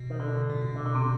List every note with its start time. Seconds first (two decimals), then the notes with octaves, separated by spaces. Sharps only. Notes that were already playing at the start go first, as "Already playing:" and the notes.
Already playing: B2
0.10 D#3
0.20 D3
0.50 A#2
0.61 B2
0.76 D3
0.86 D3
0.95 C3